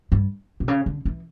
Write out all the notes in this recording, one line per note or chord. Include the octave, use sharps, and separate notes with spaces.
G2
B2
C#3
D3
E3